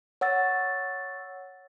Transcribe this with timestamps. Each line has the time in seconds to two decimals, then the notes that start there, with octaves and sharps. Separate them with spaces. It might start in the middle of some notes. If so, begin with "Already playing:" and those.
0.21 C#5 F#5 E6 A6